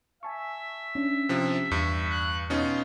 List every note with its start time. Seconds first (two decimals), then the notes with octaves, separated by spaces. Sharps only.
0.23 E5 G#5 A5 C#6
0.95 C#4 D4
1.29 C3 F3
1.71 E2 G2 C#7
2.10 F#6
2.50 B2 C#4 D#4 F4